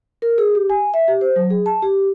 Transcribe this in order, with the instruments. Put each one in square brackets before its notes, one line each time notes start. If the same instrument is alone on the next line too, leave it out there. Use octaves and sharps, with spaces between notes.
[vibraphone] A#4
G#4
G4
G#5
E5
G4
C5
F#3
G#4
A5
G4